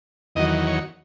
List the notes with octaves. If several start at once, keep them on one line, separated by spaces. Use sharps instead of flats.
E2 D#3 F#3 D#5
C#5